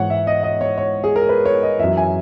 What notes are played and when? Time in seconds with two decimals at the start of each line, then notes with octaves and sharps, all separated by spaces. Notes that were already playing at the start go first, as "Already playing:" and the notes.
Already playing: G#2 E3 C#5 F#5
0.10 E5
0.27 D#5
0.43 D#5
0.61 C#5
0.78 C#5
1.04 G#4
1.16 A#4
1.29 B4
1.45 C#5
1.63 D#5
1.79 F#2 E3 E5
1.97 G#5